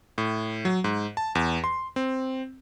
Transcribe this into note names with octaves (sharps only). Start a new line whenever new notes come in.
A2
F#3
G#2
A5
E2
C6
C4